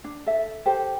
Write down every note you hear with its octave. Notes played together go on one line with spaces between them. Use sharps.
D4
A4 E5
G4 A4 C5